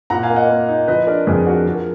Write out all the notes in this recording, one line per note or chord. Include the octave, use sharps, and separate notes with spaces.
A#2 F#5 A#5
F5 G#5
A#3
D#5 F#5
A#3
D#4
F3 B4 D#5
D4 A#4 D5
F2 G#4 B4
D4 F#4 A#4
F3 G#4
A#4